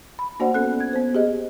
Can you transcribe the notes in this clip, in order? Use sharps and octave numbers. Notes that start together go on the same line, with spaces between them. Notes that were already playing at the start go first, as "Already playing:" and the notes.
B5
A#3 D4 F#4 C5 D5 F#5
B3 C#4 A4 F#6
G#6
B3 C5
G4 G#4 D#5